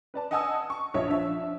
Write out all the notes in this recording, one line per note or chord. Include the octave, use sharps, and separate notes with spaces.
B4 D5 A5
D#5 F#5 G#5 A5 D#6 E6
C#6
A#1 F4 C#5 D#5 E5
F3 D4 E5